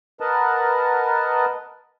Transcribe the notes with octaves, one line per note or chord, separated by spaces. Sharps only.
A#4 B4 D#5 F#5 A5